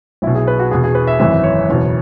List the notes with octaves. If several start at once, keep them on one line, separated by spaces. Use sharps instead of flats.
B1 E4
B2
G#4
B4
F#4
E1 E2 B2 G#4
G#4
B4
E5
G#1 F#2 E3 E5
C#5
F#1 E2 B2